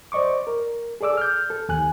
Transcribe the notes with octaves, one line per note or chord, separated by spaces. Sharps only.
C5 D5 D#5 C#6 D6
A#4
G#4 A4 D5 D6 E6
F6 G6
A4
D#2 G#5 F#6